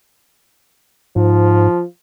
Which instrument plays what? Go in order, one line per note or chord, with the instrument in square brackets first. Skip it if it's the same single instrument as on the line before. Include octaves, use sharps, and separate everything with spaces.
[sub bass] G#2 [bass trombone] F3